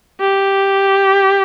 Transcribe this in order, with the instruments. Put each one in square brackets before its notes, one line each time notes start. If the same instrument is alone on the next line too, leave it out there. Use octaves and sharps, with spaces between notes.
[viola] G4